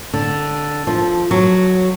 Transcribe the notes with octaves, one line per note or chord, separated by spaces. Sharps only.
D3
F3
F#3